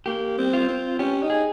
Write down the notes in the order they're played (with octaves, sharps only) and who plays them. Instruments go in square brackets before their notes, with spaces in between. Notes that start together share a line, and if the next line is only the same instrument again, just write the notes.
[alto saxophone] A#3 [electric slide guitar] G4
[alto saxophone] C4
[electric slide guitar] F4
[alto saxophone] C4
[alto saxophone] C#4 [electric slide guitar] G4
[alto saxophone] D#4
[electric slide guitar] G#4